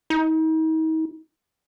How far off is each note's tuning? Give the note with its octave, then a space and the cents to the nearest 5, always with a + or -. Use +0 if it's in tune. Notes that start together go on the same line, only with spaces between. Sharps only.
D#4 +40